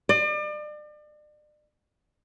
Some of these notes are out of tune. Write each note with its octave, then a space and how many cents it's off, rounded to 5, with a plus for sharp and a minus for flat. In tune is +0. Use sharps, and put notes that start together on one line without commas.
D5 +40